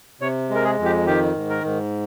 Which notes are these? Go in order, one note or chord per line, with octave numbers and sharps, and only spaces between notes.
C3 C#5
G#3
A#4
G#4
F2
G4
D#3 G4
G#2
A#4
G#2